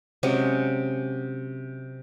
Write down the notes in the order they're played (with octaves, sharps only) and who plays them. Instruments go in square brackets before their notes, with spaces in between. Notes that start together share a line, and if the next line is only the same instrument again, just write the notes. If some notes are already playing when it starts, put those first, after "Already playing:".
[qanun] C3 F#3 G#3 C#4